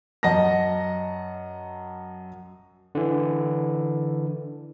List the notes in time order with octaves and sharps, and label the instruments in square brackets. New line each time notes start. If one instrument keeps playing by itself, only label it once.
[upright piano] F#2 D#5 F#5 A5 A#6
[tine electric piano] D3 E3